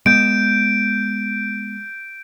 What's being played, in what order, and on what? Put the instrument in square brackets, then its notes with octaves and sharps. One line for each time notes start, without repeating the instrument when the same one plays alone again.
[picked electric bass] G#3 B3 [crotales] G6 D7